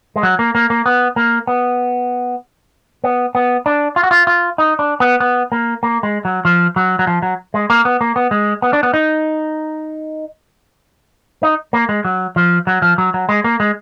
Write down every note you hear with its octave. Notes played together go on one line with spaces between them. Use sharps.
G#3
F#3
A#3
A#3
A#3
B3
A#3
B3
B3
B3
D4
F4
F#4
F4
F4
D#4
D4
B3
B3
A#3
A#3
G#3
F#3
F3
F#3
F#3
F3
F#3
G#3
A#3
B3
A#3
B3
G#3
B3
D4
B3
D#4
D#4
A#3
G#3
F#3
F3
F#3
F3
F#3
F#3
G#3
A#3
G#3